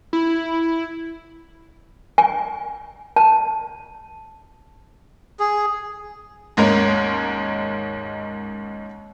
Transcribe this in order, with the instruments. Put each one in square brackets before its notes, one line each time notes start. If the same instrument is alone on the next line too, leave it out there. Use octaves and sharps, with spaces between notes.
[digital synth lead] E4
[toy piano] G#5
A5
[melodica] G#4
[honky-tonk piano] D#2 G#2 G#3 A#3 C#4 A#4